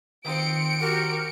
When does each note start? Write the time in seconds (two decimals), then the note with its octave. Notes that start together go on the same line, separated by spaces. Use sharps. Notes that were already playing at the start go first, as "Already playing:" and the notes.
0.25 D#3 F3 C4 C#7 D7
0.81 F#4 G4 A#4